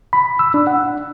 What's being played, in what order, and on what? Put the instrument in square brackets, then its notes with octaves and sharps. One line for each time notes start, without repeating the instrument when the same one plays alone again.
[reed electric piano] B5
E6
D4
F#5